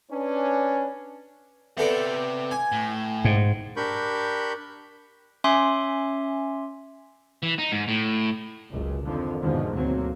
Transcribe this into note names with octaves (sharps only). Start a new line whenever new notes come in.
C#4 D4 B4
B3 C4 A4 D5 E5
G#5
A2
G#2
D4 G4 A#4 B5 C#6 G6
C#4 E5 G#5 C6 D6
E3
D#4
G#2
A2
F#1 C#2
F2 D3 D#3 F3
E2 G#2 B2 D3 D#3 F3
D2 F#3 A#3 C4